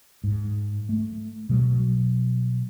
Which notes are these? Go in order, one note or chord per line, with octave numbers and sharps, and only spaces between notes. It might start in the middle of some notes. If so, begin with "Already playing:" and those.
G#2
A3
B2 F#3 G3